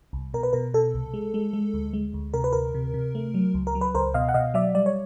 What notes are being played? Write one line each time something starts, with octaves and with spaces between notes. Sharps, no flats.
C2
B2 A#4
B4
B2 A#4
B2 A4
C2
G#3
G#3
G#3
D2
G#3
D2
C3 A#4
B4
D2 A#4
C3
C3
A3
F#3
C#2
A#4
F#3
B4
C#2 A#4 C5
B2 D#5 F5
F#5
B2 D#5 F5
F#3 D5 E5
G3 D5
C#5